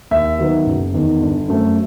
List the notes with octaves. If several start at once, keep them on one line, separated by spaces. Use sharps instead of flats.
D#2 E5
D#3 F#3 B3
F#1
E2 D#3
G1
F#2 F#3 A3 C4